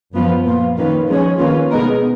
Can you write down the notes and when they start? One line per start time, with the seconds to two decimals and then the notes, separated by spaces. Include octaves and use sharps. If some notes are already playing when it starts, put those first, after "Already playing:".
0.13 F#2 F3 B3 F4 B4
0.45 A#2 F3 B3 F4
0.77 D#3 A#3 C#4 F4 B4
1.08 F3 G#3 C#4 G#4 C#5
1.39 D#3 A#3 C#4 F4 B4
1.71 B2 G#3 B3 D#4 A#4